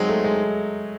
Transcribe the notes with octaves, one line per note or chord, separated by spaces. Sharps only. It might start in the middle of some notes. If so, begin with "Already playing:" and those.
Already playing: F#3 G#3 C4 D#4
A3
G#3